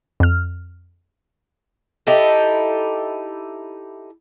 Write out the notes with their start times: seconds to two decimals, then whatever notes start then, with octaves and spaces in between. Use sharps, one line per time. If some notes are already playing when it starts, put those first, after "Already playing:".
0.20 F2 F6
2.07 D#4 E4 G4 A4